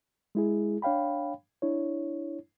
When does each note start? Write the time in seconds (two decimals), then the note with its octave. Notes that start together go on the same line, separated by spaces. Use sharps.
0.35 G#3 E4 G#4
0.82 D4 C#5 F5 G5 B5
1.62 D4 E4 C#5